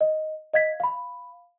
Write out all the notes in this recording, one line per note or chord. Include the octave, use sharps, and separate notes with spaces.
D#5
D#5 F5 G#6 B6
F5 B5